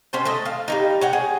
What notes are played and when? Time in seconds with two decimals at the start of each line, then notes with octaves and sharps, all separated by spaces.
0.13 C#4 A4 C5 G5
0.25 A3 A4 D#5
0.45 F5
0.68 G3 A#3 D#4
1.01 C#5 F#5 G5
1.13 G#4